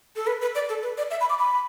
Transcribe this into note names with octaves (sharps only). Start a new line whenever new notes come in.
A4
B4
B4
D5
A4
B4
D5
E5
B5
D6
B5